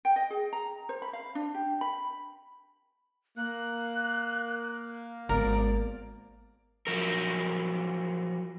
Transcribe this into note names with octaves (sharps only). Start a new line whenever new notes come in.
G5
D#5
G#4
A#5
C5
B5
F5
D4
G4
B5
A#3 F#6
G#1 B3 A#4 D5
F3 F#3 A#4